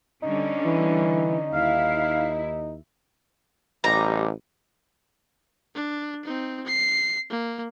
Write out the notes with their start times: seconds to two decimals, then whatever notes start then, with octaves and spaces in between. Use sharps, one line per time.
0.23 D3 G3 C#4 D#4
0.66 E3
1.53 D#2 E4 F5
3.84 A1 G3 D#4 A#5
5.75 D4
6.25 C4 D#4
6.67 C7
7.30 A#3